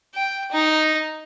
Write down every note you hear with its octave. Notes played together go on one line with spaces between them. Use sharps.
G5
D#4